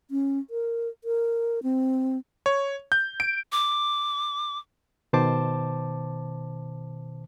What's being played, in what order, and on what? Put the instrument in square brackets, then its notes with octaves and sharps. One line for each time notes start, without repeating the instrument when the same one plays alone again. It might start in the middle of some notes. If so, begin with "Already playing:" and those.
[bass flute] C#4
A#4
A#4
C4
[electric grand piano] C#5
G6
D7
[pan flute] D6
[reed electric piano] B2 D#3 C5 A5 D6